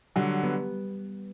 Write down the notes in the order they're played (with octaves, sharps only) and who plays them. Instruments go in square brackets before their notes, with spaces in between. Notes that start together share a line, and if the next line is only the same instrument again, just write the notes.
[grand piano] D3 F#3 [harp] G3
[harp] B3